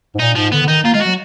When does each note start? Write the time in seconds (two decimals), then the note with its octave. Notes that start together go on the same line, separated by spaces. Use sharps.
0.15 G#2
0.20 A#2 D#4
0.36 G#2 F3
0.52 D3 B3
0.62 D3
0.68 D#3 D#4
0.84 A#3 F4
0.94 G#3 F4
1.01 F#3 F#4